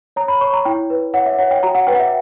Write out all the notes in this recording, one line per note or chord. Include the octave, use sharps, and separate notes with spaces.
C#5 A#5
B5
C#5 C#6
A#5
E4 G5
B4
C#5 F#5
E5
C#5 F#5
G5
F#4 A#5
F#5
B4 G5
F#5
E5